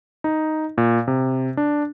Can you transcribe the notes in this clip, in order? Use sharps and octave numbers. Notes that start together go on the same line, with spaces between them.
D#4
A#2
C3
D4